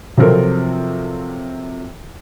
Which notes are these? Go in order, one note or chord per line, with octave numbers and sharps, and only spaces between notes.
C3 F3 F#3 C4 A4 A#4